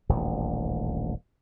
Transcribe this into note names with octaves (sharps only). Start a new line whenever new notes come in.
D#1 A1 D2